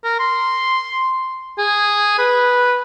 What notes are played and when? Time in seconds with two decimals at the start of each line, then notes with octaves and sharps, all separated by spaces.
0.04 A#4
0.19 C6
1.58 G#4
2.18 B4